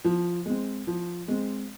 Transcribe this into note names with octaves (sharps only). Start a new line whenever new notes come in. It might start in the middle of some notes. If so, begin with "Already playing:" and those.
F3
G#3 C4
F3
G#3 C4